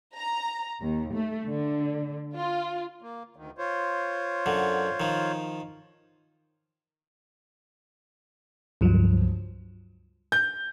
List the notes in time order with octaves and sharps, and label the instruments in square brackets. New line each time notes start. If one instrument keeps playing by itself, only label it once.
[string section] A#5
D#2
A3
D3
F4
[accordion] A#3
D2 D#3
F4 C5 C#5
[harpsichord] F#2 D3
D#3 F3
[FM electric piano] C#2 G2 F3 F#3
[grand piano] G6